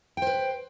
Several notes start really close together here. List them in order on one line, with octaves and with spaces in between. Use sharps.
G5 C5 B4